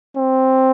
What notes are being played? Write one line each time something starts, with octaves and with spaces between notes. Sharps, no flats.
C4